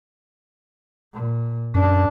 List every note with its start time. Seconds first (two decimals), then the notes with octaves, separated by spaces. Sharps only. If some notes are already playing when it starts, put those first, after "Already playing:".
1.13 A#2
1.75 F#2 D4